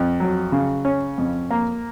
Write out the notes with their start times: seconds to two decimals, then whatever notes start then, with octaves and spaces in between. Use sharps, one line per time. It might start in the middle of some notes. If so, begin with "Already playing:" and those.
Already playing: F2
0.20 F#3
0.52 C#3
0.85 C#4
1.18 F2
1.51 A#3